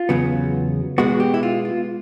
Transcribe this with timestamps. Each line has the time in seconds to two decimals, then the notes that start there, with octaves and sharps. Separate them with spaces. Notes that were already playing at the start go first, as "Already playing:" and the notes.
Already playing: F4
0.09 E2 C#3 F#3 B3
0.98 B2 G#3 B3 F#4
1.20 G4
1.34 E4
1.43 F4
1.65 F4